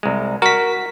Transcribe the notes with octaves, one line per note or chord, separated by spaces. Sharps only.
C2 G#3
F#4 A#4 B6